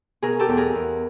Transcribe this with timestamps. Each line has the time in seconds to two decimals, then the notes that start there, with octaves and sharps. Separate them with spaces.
0.22 B2 G#4 A#4
0.39 G4 A4
0.49 E2
0.57 G#4 A#4
0.75 E2